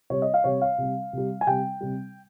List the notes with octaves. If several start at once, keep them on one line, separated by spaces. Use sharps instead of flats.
C3 G3 C#5
D#5
F5
C3 G3 C#5
F5
C3 G3
C3 G3
G#5
C3 G3 G5
C3 G3